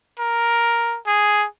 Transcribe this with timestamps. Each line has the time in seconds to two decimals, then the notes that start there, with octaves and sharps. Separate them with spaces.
0.19 A#4
1.07 G#4